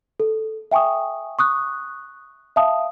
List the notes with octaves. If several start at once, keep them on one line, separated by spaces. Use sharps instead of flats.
A4
E5 G5 G#5 C#6 D#6
C#6 D#6 F#6
E5 F5 A5 D#6